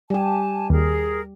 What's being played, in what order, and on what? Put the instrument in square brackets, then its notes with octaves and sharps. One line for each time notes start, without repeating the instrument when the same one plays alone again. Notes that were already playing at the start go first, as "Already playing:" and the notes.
[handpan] G3 G4 [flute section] G#5 A5
[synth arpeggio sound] D#2 [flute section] G#4 A#4